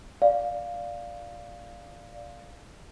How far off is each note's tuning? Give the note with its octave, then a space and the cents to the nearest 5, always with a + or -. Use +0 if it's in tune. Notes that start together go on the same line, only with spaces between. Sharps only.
D5 +0 F5 +0